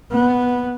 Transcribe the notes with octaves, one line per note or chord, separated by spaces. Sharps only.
B3